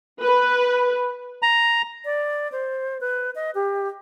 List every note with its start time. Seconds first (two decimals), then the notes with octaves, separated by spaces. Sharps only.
0.22 B4
1.42 A#5
2.05 D5
2.52 C5
3.01 B4
3.35 D#5
3.55 G4